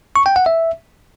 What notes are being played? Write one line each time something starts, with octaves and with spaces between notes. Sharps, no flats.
C#6
G5
F#5
E5